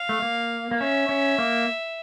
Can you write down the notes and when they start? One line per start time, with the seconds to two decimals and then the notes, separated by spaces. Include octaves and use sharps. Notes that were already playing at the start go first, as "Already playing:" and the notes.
Already playing: F5
0.09 A3
0.22 A#3
0.71 A#3
0.80 C#4 E5
1.09 C#4
1.38 A#3